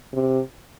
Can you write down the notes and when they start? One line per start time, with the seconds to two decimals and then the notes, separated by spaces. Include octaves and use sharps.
0.13 C3